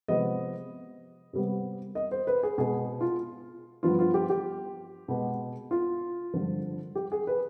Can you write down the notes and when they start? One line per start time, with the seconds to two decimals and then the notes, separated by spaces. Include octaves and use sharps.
0.08 C3 F3 G#3 B3 D#5
1.33 C3 G3 B3
1.95 D#5
2.11 C5
2.27 B4
2.43 G#4
2.58 B2 G#3 B3 G#4
3.01 F4
3.83 G2 F3 B3 F4
3.99 F4
4.14 G4
4.30 G4
5.08 B2 G#3 B3
5.71 F4
6.34 G2 D3 F3
6.95 G4
7.12 G#4
7.27 B4